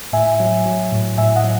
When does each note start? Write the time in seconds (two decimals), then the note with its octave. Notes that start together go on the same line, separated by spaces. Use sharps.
0.13 A2 E5 G#5
0.40 F#3
0.66 F#3
0.92 A2
1.18 A2 E5 G#5
1.36 D#5 F#5
1.44 F#3